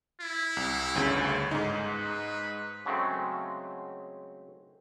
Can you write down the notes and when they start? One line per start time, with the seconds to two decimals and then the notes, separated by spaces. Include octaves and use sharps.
0.21 E4
0.57 C2
0.95 G1 D2 C#3
1.51 G#2 D#4
1.88 B4
2.86 C#3 F#3 G#3 A3 C4